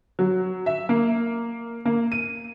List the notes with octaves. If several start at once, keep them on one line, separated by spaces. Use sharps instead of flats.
F#3
E5
A#3
A#3
D#7